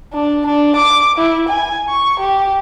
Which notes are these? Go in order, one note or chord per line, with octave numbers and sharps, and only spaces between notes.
D4
D4
D6
E4
G#5
C#6
G4